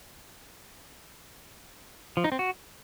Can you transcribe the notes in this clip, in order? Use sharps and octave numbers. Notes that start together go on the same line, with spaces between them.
F3
D#4
C4
F#4